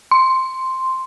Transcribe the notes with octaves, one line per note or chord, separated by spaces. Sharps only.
C6